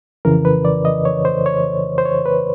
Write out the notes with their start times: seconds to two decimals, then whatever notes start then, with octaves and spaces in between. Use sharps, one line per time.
0.25 F2 C#3 E3 A#4
0.45 B4
0.65 D5
0.85 D#5
1.05 C#5
1.25 C5
1.46 C#5
1.98 C5
2.05 C#5
2.26 B4